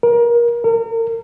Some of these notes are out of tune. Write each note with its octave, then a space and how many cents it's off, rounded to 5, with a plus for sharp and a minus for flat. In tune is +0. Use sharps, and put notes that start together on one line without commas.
A#4 +25
A#4 -35